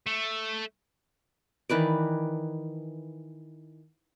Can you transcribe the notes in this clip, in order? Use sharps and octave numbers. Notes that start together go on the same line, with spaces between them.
A3
D#3 E3 B4 D5